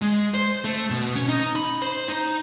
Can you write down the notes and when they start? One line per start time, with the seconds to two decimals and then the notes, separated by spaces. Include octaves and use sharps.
0.02 G#3
0.34 C5
0.64 A3
0.90 B2
1.15 C#4
1.29 D#4
1.56 B5
1.82 C5
2.08 D#4